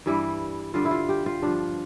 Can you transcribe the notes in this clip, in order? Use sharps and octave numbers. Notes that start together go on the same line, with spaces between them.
G2 E3 G3 E4
G2 D3 G3 F4
E4
F4
G4
F4
G2 F3 D4